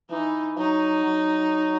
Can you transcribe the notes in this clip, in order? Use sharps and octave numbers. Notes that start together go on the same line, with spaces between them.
E3 D#4
F#3 D#4
F#3